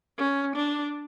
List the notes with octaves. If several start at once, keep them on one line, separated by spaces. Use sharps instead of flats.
C#4
D4